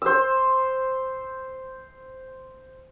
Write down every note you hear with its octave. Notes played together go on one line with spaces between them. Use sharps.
C5 E6